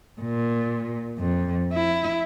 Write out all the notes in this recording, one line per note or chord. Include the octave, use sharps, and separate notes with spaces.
A#2
F2
E4